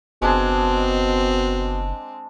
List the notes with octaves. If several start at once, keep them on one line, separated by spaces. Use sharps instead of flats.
F#1 B2 G#3 C4 D4 G#4